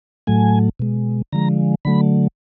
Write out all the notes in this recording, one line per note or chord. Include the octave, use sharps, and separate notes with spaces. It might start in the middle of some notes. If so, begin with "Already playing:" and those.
A2 F#3 A3 G#5
B2 G#3
D3 F3 G#3 A#5
D3 F#3 A3 B5